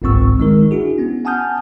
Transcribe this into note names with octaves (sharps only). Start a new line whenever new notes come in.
G1 C2 G#2 C4 C#6 E6
D#3 G#3 D#4 A#4
D4 E4 F#4 G#4
B3 C#4
F#5 G#5 A5 D#6 F6 G6